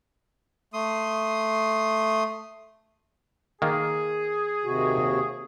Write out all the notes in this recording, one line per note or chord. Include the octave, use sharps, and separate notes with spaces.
A3 C6 D#6
D#3 A#3 G#4
D#2 C3 F#4